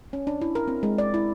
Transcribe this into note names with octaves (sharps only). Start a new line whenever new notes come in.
C#4
D4
E4
A#4
C4
G#3
D5
E4